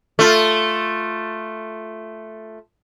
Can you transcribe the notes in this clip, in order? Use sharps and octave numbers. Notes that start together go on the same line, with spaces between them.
A3 F4